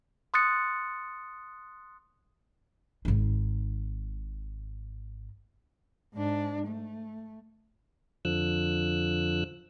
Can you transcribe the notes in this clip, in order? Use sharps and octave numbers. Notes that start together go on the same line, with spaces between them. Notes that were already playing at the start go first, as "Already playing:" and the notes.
C6 D#6 F#6 A6 C#7
G#1 D#4
G#2 D4
A3
F2 D3 F3 E6 F#6